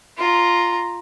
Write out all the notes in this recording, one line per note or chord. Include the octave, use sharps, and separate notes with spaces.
F4 A#5